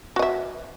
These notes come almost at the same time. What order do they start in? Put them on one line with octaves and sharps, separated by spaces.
F#4 D#5 E5